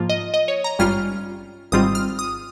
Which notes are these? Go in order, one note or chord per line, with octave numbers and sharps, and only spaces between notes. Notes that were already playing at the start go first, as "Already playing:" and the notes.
Already playing: G#2 F3 A#3 F4
D#5
D#5
C#5
A#5
G#1 G2 G3 C#4 F4 F6
G#1 G#2 G3 C4 F4 D#6
F6
D#6